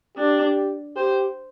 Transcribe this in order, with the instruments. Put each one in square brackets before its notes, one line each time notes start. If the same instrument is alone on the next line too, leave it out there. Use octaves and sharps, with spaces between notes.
[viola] D4 [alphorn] G4
[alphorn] G4 [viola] C5